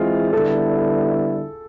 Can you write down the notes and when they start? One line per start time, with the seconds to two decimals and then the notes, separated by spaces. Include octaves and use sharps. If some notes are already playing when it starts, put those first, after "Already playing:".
Already playing: E3 G#3 C4 E4 F4 G#4
0.33 D3 G3 B3 E4 A4